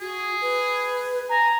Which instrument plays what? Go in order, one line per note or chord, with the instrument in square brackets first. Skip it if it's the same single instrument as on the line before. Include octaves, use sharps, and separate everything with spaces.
[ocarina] F#4 [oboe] G#4
[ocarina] B4
[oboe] G#5 [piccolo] A#5